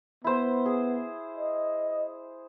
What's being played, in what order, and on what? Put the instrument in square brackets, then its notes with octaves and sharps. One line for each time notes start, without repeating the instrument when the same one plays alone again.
[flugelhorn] B3 [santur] E4 C5
[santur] G#4
[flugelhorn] D#5